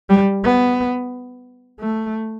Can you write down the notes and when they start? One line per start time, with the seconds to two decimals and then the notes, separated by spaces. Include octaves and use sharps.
0.09 G3
0.44 B3
1.80 A3